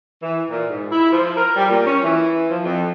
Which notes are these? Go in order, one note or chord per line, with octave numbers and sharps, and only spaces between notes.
E3
A#2
G#2
E4
F3
A#4
G3
A#2
C#4
E3
F3
F2